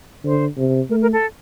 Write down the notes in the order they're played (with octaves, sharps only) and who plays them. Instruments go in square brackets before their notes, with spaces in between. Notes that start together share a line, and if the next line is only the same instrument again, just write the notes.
[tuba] D3 [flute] C5
[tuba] C3
[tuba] A3 [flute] A#4
[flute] A#4
A4